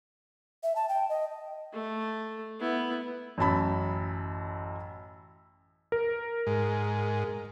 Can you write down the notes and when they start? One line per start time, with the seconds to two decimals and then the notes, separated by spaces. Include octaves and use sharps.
0.63 E5
0.76 A5
0.89 G5
1.09 D#5
1.73 A3
2.60 B3 E4
3.38 A1 F#2 A5 B5
5.92 A#4
6.47 G#2